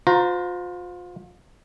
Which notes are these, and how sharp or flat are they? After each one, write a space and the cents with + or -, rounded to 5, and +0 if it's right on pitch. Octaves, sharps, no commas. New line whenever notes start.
F4 +35 C5 -25 A#5 +0